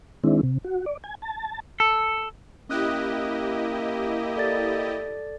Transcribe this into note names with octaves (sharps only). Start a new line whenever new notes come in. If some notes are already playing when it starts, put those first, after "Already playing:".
D#3 G#3 C4 D4 E4
C3
F#4
D5
G#5
A5
A4
A#3 C#4 E4 G4 D#5 D#6 F#6
A4 D5 A6